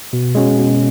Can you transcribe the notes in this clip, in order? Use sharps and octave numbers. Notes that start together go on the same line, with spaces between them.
B2
G#3 C#4 F#4
B2